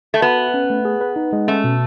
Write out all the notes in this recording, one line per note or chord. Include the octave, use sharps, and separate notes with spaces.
A3
B3 F#4
B4
C#4
A3
G#4
B4
D#4
G#3
A3 C#4
B2